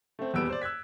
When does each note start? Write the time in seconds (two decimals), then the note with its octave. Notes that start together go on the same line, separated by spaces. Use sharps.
0.19 A3 C4
0.33 D#1 E2 G3 B3 E6 D7
0.49 C5 D5
0.62 E6 F#6 G#6 B6